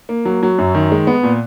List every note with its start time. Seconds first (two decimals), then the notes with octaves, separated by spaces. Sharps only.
0.09 A#3
0.25 F#3
0.43 F#3
0.58 F#2
0.75 D#3
0.92 G#3
1.07 B3
1.23 A#2